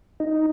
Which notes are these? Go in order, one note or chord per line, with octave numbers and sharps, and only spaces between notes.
D#4